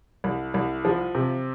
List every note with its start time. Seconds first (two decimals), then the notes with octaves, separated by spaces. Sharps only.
0.24 C2
0.54 C2
0.85 F3
1.15 C3